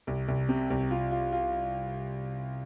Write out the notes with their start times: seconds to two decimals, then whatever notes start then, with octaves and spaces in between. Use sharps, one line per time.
0.07 C2
0.28 C2
0.49 C3
0.70 C2
0.91 F4
1.11 F4
1.32 F4